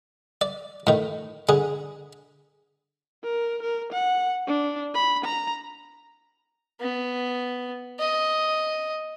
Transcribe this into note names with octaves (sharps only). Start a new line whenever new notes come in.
D5
A2 D#3
D3 G#4
A#4
A#4
F#5
D4
B5
A#5
B3
D#5